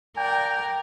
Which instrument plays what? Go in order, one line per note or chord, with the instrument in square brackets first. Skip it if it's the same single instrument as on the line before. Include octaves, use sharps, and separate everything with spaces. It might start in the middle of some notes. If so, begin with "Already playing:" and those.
[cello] A#4 D5 [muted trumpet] G5